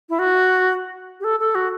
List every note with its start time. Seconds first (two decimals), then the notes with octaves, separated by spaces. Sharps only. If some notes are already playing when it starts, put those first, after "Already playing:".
0.09 E4
0.19 F#4
1.20 G4
1.24 A4
1.40 A4
1.55 F#4